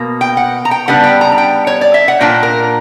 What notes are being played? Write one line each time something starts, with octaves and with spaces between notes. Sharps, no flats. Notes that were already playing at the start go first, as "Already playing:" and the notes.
Already playing: B2 A#3
G5
F#5
A#5
G5
C#3 G3 B3 D4 F#5
G5
A#5
A#5
G5
C#5
D5
E5
F#5
A#2 A#3 D4 G5
A#4